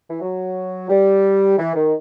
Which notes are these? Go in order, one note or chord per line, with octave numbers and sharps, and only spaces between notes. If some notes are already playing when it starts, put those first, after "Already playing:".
E3
F#3
G3
E3
D#3